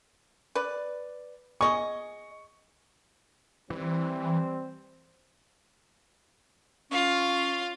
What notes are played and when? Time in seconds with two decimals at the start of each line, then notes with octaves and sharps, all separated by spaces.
0.55 B4 D5
1.61 G#4 D#5 C#6
3.70 E3 G3 C4
6.92 C#4 F4 F5